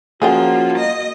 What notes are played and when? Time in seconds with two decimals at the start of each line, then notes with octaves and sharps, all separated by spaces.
0.22 F3 A#3 C#4 F#4 G#4 F#5 G5
0.78 D#5